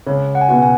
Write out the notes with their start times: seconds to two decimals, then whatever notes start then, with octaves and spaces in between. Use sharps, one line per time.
0.07 C#2 C#5
0.35 F#5
0.41 G#5
0.48 B2 B3 F#4 F#5
0.63 G#5